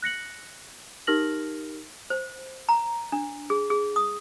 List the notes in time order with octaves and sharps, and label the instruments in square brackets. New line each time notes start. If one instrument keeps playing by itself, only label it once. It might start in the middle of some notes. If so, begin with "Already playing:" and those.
[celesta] F#6 A#6 C#7 F#7
D#4 G4 A#4 F6 A#6 F#7
[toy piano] C5
A#5
D4
G#4
G#4
D#6